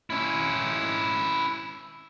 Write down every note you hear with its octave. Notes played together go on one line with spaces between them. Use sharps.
C#4 E4